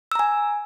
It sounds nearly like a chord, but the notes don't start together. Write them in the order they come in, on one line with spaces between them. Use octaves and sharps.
E6 A#5 G#5